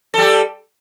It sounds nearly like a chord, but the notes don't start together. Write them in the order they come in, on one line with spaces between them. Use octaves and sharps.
A4 G3 G4